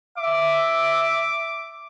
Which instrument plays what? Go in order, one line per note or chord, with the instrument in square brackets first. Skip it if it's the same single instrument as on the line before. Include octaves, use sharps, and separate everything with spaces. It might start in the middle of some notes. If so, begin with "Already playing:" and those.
[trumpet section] E5 [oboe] D6